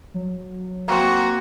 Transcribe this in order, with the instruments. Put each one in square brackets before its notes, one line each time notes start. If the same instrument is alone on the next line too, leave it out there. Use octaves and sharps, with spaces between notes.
[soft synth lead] F#3
[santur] A#3 C4 [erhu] F#4